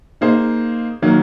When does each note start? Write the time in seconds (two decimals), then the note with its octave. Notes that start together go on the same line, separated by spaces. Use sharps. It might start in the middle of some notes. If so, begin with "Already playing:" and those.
0.21 A#3 D#4 G#4 C5
1.02 D#3 F#3 A#3